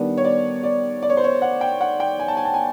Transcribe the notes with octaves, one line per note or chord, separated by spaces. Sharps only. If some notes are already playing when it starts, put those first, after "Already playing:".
Already playing: D#3 G3 B3 D4
C#5
D5
D5
D5
C#5
C5
C#5
F#5
G5
F#5
G5
G#5
A5
G#5
A5
G#5